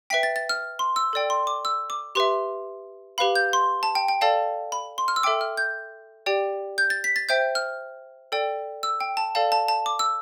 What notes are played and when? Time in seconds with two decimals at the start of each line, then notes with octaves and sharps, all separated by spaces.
0.10 B4 E5 G5 B6
0.23 A6
0.36 A6
0.49 F6
0.79 C6
0.96 E6
1.13 A4 D5 G5
1.30 C6
1.47 D6
1.65 E6
1.90 D6
2.15 G4 B4 E5 C6
3.18 G4 B4 F5 B5
3.36 G6
3.53 C6
3.83 A5
3.95 G5
4.08 G5
4.21 A4 D5 F5 A5
4.72 B5
4.98 C6
5.08 F6
5.16 E6
5.23 A4 E5 G5 D6
5.41 F6
5.57 G6
6.26 G4 D5 G5
6.78 G6
6.90 A6
7.04 B6
7.16 A6
7.29 C5 E5 G5 G6
7.55 F6
8.32 A4 D5 G5
8.83 E6
9.00 G5
9.17 A5
9.35 A4 D5 F5 A5
9.52 A5
9.68 A5
9.86 D6
9.99 E6